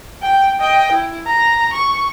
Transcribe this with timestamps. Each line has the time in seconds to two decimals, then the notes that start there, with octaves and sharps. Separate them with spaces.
0.22 G5
0.60 D#5 G5
0.92 E4
1.26 A#5
1.73 C#6